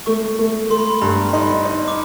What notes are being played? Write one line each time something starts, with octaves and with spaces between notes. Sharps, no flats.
A3 C#6
A3
A3 C6
B5
C6
G2 A#5
B5
D#4 C6
D#4
D6